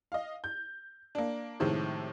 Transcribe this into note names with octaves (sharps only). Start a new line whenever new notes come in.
D#5 F5
G6
A#3 D4
A2 C3 D#3 F3 G#3